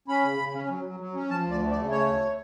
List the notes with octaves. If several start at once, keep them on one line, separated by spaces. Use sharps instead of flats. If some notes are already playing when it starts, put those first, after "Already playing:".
C#4 B5
C#3
C#3
C#4
F#3
F#3
F#3
C#4
F3 A5
D2 D5
A3
D5
C#3
A3 C#5
D2